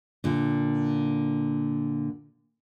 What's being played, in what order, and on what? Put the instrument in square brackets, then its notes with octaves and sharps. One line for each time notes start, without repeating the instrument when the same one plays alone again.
[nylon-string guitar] A#2 D3